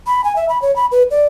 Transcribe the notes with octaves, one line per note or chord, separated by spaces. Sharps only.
B5
G#5
E5
B5
C#5
B5
B4
D5